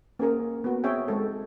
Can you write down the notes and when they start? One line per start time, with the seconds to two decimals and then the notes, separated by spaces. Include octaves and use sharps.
0.19 A#3 C#4 G#4 A#4
0.64 B3 F#4
0.84 C4 G#4 C#5 E5 G5
1.08 G#3 A4